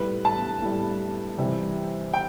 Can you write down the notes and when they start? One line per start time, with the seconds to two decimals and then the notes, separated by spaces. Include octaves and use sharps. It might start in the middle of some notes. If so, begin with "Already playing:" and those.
Already playing: A2 G3 B4
0.25 A5
0.62 A2 G3
1.38 C3 E3 G3
2.14 G5